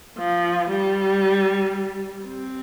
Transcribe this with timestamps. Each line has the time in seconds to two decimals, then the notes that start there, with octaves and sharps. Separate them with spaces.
0.18 F3
0.70 G3
2.25 C4